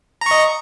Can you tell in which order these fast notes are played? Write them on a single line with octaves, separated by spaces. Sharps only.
A#5 C#6 D#5